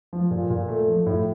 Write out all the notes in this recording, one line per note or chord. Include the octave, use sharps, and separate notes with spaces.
F3
A#2
A#2
A3
F3
A2